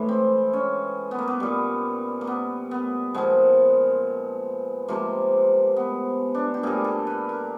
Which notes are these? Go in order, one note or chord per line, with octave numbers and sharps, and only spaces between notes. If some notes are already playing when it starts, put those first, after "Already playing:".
Already playing: A2 E3 G#3
C4
C#4
B3
A#3
B3
A#2 G3
A#3
B3
B3
A#2 F3 G#3 B3
C3 F3 G#3 A#3
B3
D4
G4
A#2 G3 G#4
A4
B4
A#4